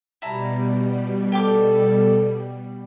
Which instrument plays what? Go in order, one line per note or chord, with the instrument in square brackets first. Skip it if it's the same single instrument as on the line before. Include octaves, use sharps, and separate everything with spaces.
[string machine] B2 G3 [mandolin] E4 A5 A#5
[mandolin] G4 G5 D6 [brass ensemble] A4